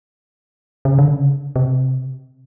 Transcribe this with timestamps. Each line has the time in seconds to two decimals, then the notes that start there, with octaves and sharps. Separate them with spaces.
0.85 C#3
0.99 D3
1.13 C#3
1.56 C3